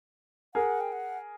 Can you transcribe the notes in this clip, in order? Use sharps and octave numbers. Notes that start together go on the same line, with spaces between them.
G#4 A#4 F#5
G5
F#5